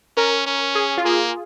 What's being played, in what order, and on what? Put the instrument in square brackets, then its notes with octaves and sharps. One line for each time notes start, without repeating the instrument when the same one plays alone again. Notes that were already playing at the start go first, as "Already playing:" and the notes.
[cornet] C#4 [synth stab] A#4
[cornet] C#4
[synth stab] G#4
F4
[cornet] A#3 [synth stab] G#4